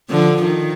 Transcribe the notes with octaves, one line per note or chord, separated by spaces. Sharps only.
D3 F3
D#3